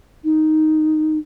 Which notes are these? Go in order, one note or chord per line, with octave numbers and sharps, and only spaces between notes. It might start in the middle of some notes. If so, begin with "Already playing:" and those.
D#4